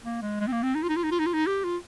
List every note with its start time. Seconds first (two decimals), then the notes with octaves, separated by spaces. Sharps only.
0.04 A#3
0.22 G#3
0.40 G#3
0.47 C4
0.52 A#3
0.63 C4
0.75 D#4
0.83 F4
0.89 D#4
0.97 F4
1.04 D#4
1.11 F4
1.19 D#4
1.26 F4
1.34 D#4
1.47 G4
1.64 F4